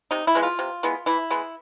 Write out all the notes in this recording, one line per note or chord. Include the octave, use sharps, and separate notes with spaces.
C3 D#4
E4
E3 G#3 B3
F4
C3
E3 G#3 B3
E3 E4
G#3 B3